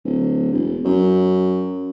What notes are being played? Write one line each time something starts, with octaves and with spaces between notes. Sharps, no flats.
D1
E1
F#2